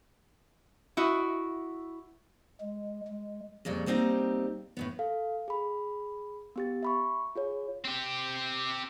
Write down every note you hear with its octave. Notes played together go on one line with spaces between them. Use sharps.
E4 F#4 D#5
G#3
G#3
F2 A#2 C#3 G3
G3 A#3 C4 D#4 G4
A2 D#3 B3
A4 F5
G#4 B5
B3 G4 A6
E5 B5 C#6
F4 G#4 C#5
C4 G4